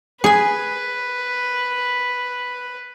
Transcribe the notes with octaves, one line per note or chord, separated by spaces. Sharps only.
G#4 B4 G#5